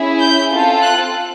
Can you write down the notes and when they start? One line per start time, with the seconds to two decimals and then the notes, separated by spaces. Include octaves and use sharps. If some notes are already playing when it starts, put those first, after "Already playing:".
Already playing: C#4 E4 G#4
0.20 G6
0.51 C4 F4 A4
0.82 F#6